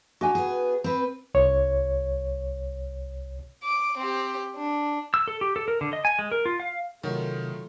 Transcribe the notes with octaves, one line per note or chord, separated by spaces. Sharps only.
D4 D#4 F#4 G#5
B3 G#4
C4 B4
C2 C#5
D6
C4 G4
D4
E6
A4
G4
A4
A#4
D3
D#5
G#5
G#3
A#4
F4
F5
C3 D#3 F#3 A3 F4